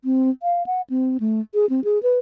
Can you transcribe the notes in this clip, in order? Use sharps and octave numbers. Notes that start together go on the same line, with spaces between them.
C4
F5
F#5
C4
A3
G#4
C4
G#4
B4